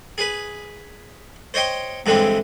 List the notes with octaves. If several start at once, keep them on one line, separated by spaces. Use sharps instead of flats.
G#4 B4
C5 C#5 D#5 G5 C6
G2 D3 E3 G#3 C4